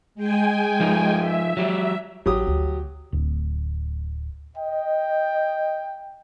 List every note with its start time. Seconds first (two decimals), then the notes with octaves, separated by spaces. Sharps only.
0.15 G#3 G5 G#5
0.80 F3 D#4
1.19 E5
1.57 F#3 G4
2.26 A1 F#3 G4 D#6
2.47 D2
3.12 D1
4.57 D#5 G5